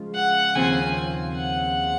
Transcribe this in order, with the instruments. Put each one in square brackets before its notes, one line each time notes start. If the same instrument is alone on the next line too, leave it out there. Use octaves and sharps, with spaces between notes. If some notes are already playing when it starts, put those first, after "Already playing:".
Already playing: [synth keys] C#3 F3 G#3 F4
[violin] F#5
[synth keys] D#2 C#3 F3 C4 F4 [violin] G#5
[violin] F#5